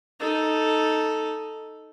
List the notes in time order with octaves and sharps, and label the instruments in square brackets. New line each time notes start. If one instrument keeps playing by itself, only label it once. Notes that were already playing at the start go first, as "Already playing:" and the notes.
[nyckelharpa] D#4 A4